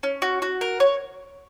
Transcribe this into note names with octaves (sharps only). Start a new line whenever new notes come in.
C#4
F#4
F#4
A#4
C#5